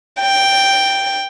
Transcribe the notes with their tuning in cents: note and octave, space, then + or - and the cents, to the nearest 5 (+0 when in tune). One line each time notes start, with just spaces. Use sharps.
G5 +0